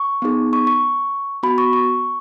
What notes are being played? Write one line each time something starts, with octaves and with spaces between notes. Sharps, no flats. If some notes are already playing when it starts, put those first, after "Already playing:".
Already playing: C#6
B3 D#4 G#4
C#6
C#6
B3 F#4 B5
C#6
C#6